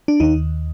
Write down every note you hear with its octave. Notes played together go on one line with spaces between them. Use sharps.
D4
D#2 D#3 D#4